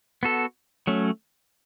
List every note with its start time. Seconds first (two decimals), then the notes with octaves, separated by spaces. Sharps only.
0.23 B3 F#4 A4
0.87 F#3 A3 C#4